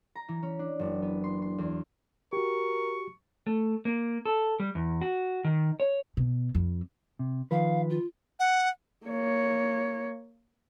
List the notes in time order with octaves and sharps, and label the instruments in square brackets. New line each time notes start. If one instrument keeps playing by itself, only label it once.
[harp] A#5
E3
C#4
D4
F#1
B3
C6
C6
E2
[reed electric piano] F#4 G4 [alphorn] A#4 [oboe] C#6
[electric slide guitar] A3
A#3
A4
G3
E2
F#4
D#3
C#5
[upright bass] B2
F2
[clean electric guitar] C3
[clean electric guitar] D#3 F3 B4 [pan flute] F5
[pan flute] F4
[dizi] F#5
[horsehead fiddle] A#3 C#5